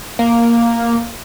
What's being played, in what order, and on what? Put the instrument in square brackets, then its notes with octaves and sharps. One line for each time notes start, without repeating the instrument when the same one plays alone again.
[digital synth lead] A#3